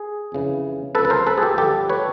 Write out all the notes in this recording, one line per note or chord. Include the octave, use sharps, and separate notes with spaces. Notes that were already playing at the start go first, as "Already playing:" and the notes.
Already playing: G#4
F2 C#3 E3
C#2 C3 F3 A4 B4
B4
A#4 C5
A4 B4
G#4
G4 A4
G2 D3 F3 G4 A4
B4 C#5